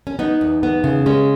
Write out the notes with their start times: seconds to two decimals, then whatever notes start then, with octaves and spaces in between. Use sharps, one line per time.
0.07 C#4
0.19 B3 D#4
0.41 E2
0.63 B3
0.84 C#3
1.06 G#3 C#4